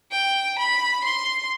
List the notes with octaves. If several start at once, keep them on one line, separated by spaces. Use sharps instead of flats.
G5
B5
C6